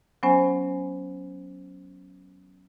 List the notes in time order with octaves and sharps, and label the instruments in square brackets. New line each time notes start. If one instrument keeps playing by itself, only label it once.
[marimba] F#3 B3 C#4 C5 G#5